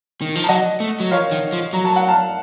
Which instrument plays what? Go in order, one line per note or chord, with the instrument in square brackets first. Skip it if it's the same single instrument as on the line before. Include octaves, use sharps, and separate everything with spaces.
[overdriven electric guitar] D#3
F3
[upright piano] A5
[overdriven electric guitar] F#3 [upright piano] D#5 F#5
[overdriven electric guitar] A3
F#3
[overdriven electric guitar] F3 [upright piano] C#5 F5
[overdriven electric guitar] D#3
F3
[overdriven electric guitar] F#3 [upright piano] A#5
[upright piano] A5
F#5
F5 A5